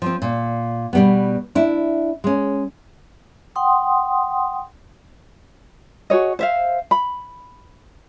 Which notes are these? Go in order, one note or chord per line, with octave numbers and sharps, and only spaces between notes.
F3 C4
A#2
B2 G3 B3
D4 E4
G#3 C#4
F#5 G5 C6 D#6
F#4 G#4 C#5 D#5
C5 E5 F5
B5